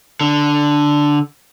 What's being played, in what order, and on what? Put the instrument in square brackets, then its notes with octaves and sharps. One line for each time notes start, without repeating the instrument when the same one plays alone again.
[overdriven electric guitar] D3